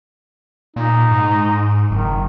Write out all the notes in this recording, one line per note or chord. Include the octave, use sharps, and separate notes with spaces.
A#2 D#4
G#2
F#1 D#3